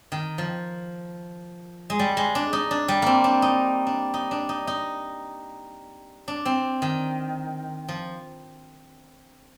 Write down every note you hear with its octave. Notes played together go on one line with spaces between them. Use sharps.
D#3
F3
G#3
G3
G#3
D4
D#4
D4
G3
A#3 C4
D4
D#4
D4
D#4
D4
D#4
D#4
D4
C4
D#3
F3